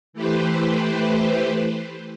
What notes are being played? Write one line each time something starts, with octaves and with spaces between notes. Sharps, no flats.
E3 A3 G4 B4 C5